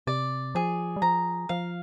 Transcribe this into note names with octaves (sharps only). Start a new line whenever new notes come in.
C3 D5
F3 G#4
G3
F3 A#5
F3 F5